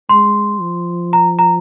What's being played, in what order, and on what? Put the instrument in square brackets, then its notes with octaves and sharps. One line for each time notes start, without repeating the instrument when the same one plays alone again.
[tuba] G#3 [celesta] C6
[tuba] F3
[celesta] A#5
A#5